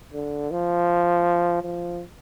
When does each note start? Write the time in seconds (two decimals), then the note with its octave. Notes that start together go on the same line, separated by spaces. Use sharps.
0.13 D3
0.51 F3
1.63 F3